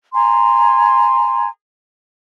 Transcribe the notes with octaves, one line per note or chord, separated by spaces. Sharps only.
G#5 A#5 C6